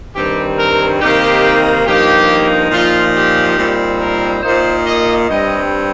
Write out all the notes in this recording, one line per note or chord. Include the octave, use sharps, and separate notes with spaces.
G2 D#3 G3 C4 G4
A#4
C3 D#3 A#3 D#4 G4
G2 F3 A#3 D#4 G4
A#2 F3 D#4 F4
G4
A#2 G3 C4 D#4
A#4
A#2 A#3 D#4 C5
D#5
G2 G3 C4 D#5